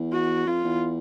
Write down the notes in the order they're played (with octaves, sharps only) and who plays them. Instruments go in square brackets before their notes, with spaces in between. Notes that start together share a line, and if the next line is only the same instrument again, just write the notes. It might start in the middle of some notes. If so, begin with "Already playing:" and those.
Already playing: [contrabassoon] E2
[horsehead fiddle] F#4
[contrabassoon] F2 [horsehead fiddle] F4
[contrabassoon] E2